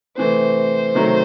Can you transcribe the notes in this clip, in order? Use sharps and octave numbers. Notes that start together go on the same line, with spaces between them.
C3 E3 A3 C5
C3 D#3 F#3 A3